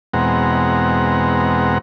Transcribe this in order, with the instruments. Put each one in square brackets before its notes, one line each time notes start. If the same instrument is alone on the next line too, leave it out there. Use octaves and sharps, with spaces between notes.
[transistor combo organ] E2 B2 G#3 C4 F#5 A#5